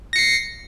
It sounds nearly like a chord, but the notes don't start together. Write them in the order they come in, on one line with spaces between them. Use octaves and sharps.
A#6 C#7 C7